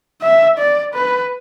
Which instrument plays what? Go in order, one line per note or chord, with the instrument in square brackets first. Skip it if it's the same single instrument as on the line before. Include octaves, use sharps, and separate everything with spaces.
[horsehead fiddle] E5
D5
B4